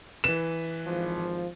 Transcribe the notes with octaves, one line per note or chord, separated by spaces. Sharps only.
E3 B4 E7
G#1 F3